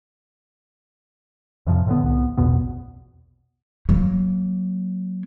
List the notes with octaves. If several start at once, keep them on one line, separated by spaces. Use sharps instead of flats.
F2 A2 C3 F3
A2 D3 B3
C2 B3
A#1 E2 B2 B3
F#3 A#3